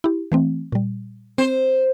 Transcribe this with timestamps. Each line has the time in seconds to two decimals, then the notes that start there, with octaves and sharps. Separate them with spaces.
0.04 E4 G4
0.32 E3 A3 C4
0.72 A#2 G3
1.38 C4 C5